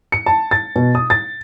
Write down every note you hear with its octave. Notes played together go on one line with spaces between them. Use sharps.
C#7
A5
A6
B2
D#6
A6